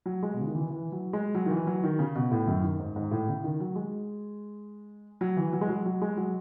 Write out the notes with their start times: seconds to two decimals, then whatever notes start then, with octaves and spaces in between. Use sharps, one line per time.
0.06 F#3
0.23 G#3
0.34 B2
0.40 C#3
0.47 D#3
0.55 E3
0.70 E3
0.92 F#3
1.13 G#3
1.35 F#3
1.46 D#3
1.51 E3
1.67 F#3
1.83 D#3
1.99 C#3
2.15 B2
2.31 A2
2.47 F#2
2.64 D#3
2.79 G#2
2.96 G#2
3.11 A2
3.28 C#3
3.44 D#3
3.60 F#3
3.76 G#3
5.21 F#3
5.37 E3
5.53 F#3
5.61 G#3
5.69 F#3
5.86 F#3
6.02 G#3
6.17 F#3